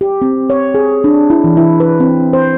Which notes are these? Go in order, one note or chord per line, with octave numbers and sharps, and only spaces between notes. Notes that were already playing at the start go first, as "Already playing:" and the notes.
G4
C4
C#5
G#4
D4
E4
E3
E4
B4
C4
C5